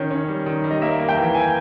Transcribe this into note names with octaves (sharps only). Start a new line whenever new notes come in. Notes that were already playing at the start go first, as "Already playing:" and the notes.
Already playing: D#3 C#4
C#4
G3
D#3
G3
D#5
A#3 E5
A#3
G5
E3
G#5